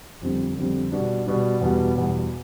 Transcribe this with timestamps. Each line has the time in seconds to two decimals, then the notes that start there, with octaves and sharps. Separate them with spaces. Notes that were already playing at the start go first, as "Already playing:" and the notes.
0.22 F2 D3 G3 C4
0.57 F2 D3 G3 C4
0.92 B2 G3 D4
1.26 B2 G3 D4
1.61 E2 B2 G3 B3
1.96 E2 B2 G3 B3